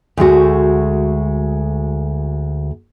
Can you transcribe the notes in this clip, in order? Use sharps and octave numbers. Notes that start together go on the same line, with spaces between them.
D2 G#3 A3 F#4